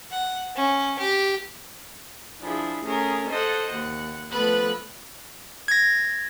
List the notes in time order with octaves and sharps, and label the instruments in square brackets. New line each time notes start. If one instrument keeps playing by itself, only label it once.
[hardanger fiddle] F#5
C#4
G4
[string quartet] F3 D4 E4 G#4
A3 C#4 G#4 A#4
A4 C5 D#5 F#5
D#2 F#5
F3 A3 B3 A4 B4 F#6
[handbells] G#6 A#6